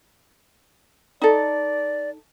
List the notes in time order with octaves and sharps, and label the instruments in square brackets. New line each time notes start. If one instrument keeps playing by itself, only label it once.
[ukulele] D#4 A4 [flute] D5